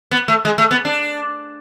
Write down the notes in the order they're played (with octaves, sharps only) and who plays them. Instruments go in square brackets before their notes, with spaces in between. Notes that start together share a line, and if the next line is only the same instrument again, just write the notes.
[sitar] B3
A3
G#3
A3
B3
D4